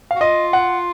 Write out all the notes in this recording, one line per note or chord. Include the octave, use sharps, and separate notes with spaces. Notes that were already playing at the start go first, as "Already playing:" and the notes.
F#4 F5
F4 D#5
F#5